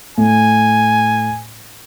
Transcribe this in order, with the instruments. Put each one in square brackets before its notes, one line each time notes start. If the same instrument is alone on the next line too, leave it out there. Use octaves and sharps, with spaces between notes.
[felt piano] A2 [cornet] G#5